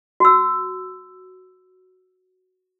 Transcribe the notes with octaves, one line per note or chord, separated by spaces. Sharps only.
F#4 E6